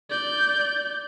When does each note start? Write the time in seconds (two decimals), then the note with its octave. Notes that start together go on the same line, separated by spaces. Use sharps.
0.10 D5 G6